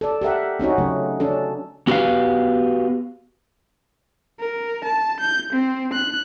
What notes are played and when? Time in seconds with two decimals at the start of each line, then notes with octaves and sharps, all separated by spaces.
0.01 A4 D5
0.21 G4 A#4 E5 F#5
0.59 C4 C#4 D#4 F#4
0.78 C#3 F#3 A3
1.20 C#4 D4 A4
1.87 B3 F#4 G4 A#4 B4 F5
4.39 A#4
4.84 A5
5.20 G6
5.53 C4
5.93 F#6